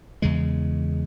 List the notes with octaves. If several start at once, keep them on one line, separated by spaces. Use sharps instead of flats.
E2 C#3 G#3